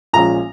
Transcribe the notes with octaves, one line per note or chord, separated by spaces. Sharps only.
A#1 A#2 G#3 C#4 A#5